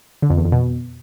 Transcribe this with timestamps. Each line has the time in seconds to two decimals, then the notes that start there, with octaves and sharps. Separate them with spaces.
0.22 D3
0.30 F2
0.37 E2
0.45 F2
0.52 B2